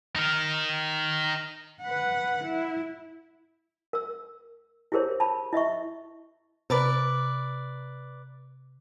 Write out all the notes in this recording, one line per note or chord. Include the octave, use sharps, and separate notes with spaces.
D#4 A#4
B4 F#5
E4
A#4 E6
E4 G4 G#4 A#4 C5 C#5
A5 B5
E4 D#5 E5 C#6
C3 A#4 B4 D5